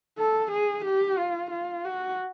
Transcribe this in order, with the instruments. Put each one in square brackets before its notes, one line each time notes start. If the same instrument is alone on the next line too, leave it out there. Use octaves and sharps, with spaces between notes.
[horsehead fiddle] A4
G#4
G4
F4
F4
F#4